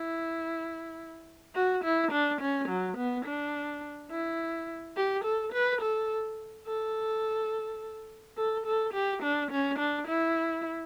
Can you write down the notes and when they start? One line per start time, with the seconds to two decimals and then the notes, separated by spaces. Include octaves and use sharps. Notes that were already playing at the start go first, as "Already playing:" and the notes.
Already playing: E4
1.55 F#4
1.84 E4
2.12 D4
2.41 C#4
2.69 F#3
2.97 B3
3.25 D4
4.11 E4
4.97 G4
5.25 A4
5.53 B4
5.81 A4
6.67 A4
8.37 A4
8.66 A4
8.94 G4
9.23 D4
9.51 C#4
9.79 D4
10.08 E4